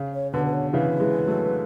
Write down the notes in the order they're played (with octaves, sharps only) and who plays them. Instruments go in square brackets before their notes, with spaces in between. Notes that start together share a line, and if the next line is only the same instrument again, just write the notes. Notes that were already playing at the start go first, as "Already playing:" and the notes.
Already playing: [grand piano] C#3
[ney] C#5
[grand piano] B2 D3 [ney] B4
[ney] B4
C#5
[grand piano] C#3 E3 [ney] B4
[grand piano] E3 G#3
F#3 A3